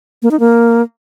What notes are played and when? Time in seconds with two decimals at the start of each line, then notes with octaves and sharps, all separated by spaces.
0.22 A#3
0.31 D#4
0.40 A#3